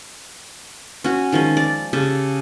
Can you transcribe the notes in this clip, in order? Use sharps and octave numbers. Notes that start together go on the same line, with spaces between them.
C#4 F#4
D#3 F3 G#3 C#4
D5
C#3 G4 A4